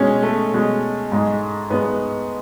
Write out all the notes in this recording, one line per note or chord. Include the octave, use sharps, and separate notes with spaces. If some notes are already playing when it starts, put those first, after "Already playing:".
Already playing: B2 G#3 C#4
A3
B2 G#3
G#2 G#3
G#2 G#3 B3